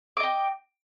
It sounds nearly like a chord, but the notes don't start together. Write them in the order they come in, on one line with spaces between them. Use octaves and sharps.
D6 D#5 G5